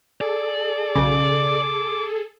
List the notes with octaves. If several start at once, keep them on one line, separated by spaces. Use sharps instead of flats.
G#4 A4 D5
B1 C#3 D6